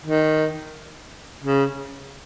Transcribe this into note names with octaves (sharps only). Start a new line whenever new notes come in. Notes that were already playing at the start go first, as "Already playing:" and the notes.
D#3
C#3